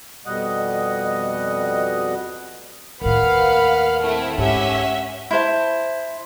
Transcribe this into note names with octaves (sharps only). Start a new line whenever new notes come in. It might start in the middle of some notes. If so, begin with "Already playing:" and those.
F2 B2 G3 D#5 F#5
D#2 A2 A#4 B4 F5 F#5 B5
A3 C4 E4
G#2 C#4 G4 E5 F#5
E4 C5 A5